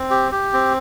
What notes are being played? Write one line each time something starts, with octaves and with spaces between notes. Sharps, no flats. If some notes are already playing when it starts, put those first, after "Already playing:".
Already playing: C4
G4
G4
C4